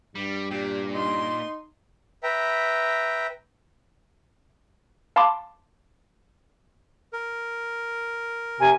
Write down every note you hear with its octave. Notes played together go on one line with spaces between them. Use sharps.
G2 G3
A#2 G4
D#4 C6
B4 E5 G5 A#5
F5 A5 B5 C6 D6
A#4
C3 G#5